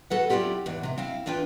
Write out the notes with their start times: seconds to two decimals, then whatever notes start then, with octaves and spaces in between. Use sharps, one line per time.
0.10 F#4 A4 B4 F#5
0.29 F#3 C4 E4 F4 G4 D5
0.66 E2 G#2
0.83 C3 A#5
0.98 C4 E4 F5
1.26 E2 D4 F4 B4 G5